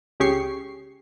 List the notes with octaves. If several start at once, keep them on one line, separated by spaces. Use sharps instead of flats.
C#2 C#4 G4 G#4 C#6 C7